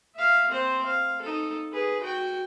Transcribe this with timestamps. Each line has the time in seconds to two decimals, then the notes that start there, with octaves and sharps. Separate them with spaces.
0.15 E5 F5
0.50 C4 C5
0.86 F5
1.21 D#4 A4
1.72 G#4 B4
2.01 F#4 G5